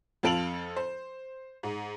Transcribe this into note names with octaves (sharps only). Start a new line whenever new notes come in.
F2 F4 A4 D7 F7 F#7
C5
G#2